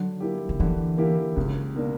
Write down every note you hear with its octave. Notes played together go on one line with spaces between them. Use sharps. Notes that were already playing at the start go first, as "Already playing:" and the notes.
Already playing: D3 F#3
A#3 E4 G4
D3
D3 E3
A#3 E4 G4
C#2 C#3
B2 A#3 D4